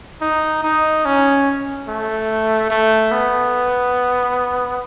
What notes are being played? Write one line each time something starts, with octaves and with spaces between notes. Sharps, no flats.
D#4
D#4
C#4
A3
A3
B3